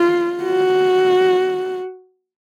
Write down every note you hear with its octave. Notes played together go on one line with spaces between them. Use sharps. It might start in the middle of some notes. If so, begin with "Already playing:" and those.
Already playing: F4
F#4